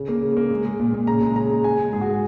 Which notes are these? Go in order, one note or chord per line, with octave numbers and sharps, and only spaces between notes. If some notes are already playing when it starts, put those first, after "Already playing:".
Already playing: C#3
A#3
C#3
A#3
G#3
G#3
A#2
A#2
C#3 A#5
G#3
C#3 A#5
G#3
G#3 G#5
G#3
G#2 G#4
F#4
G#3 G#4